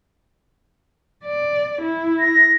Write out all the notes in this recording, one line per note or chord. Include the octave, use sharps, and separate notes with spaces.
D5
E4
A#6